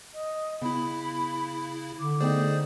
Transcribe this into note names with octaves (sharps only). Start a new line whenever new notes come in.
D#5
C#3 B3 E4 B5
D3 D6
A3 B3 D#4 G#4 C5 D5 G5